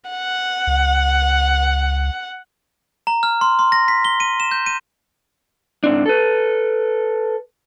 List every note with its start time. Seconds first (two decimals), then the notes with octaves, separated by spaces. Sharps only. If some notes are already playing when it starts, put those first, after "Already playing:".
0.10 F#5
0.67 C#2
3.07 A#5
3.23 F6
3.41 C6
3.59 C6
3.72 A#6
3.88 B6
4.05 G7
4.20 D#7
4.40 E7
4.51 G6
4.66 D#7
5.84 G#2 C4 D4
6.06 A4 B4